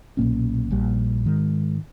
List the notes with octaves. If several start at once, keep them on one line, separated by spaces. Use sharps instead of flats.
B1 A#2 A#3 C#4
A#1 A#2 G3
G#2 D#3 G#3